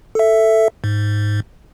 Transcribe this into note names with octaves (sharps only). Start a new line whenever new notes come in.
A4 E5
G#2